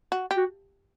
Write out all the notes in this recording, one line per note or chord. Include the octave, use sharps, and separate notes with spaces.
F#4
G4
F#4